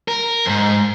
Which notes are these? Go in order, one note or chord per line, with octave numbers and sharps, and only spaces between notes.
A#4
F2 G#2